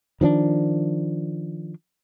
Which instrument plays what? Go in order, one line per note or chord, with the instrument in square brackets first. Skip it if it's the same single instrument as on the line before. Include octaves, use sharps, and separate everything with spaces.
[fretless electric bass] D#3 F3 B3 D4